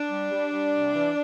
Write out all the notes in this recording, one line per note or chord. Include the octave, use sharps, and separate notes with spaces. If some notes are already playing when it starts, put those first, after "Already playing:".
Already playing: D4
G3
G3
G3
C3
E3